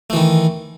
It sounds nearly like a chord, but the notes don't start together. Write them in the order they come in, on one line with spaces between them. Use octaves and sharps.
A3 E3 D#3